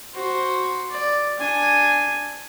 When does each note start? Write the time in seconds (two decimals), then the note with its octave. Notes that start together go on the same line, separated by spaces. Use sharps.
0.14 F#4 C5
0.91 D5
1.39 D4 G#5